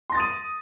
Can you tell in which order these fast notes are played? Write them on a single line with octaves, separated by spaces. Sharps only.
C6 A#6 A6 D#6 D#7